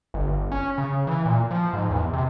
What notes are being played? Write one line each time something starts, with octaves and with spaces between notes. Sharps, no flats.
G1
C#4
C#3
E3
A#2
F3
G#2
E2
C3